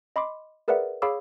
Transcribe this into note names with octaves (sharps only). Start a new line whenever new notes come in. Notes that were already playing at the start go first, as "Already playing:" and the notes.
D#5 B5 C6 D6
G#4 A#4 B4 D5 E5 F#5
G#4 C#5 F5 B5 D6 E6